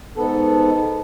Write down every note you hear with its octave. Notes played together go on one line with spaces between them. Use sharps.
G#2 B3 A4